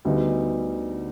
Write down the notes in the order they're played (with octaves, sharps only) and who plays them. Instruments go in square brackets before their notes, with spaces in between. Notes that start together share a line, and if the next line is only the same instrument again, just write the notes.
[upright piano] D2 D3 G3 B3 D#4